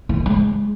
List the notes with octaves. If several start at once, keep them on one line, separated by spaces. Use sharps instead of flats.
E3
G#3